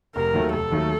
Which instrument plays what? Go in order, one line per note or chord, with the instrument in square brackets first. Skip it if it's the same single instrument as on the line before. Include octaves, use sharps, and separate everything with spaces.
[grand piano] F1 [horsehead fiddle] A#4
[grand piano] D#2 D#3 F#3 A3
[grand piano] F1 [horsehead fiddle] A4
[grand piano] D#2 D#3 F#3 A3